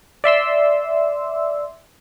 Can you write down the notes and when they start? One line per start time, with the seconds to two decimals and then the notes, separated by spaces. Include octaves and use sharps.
0.24 D5 E5 C6 E6